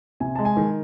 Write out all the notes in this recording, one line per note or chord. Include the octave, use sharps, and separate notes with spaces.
C3 G#5
G#3 A5
G#5
D#3